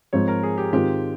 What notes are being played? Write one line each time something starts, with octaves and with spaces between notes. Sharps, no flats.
G#2 F3 C4 C#5
A#4
G#4
G4
G#2 D#3 G#3 C4 F4 G4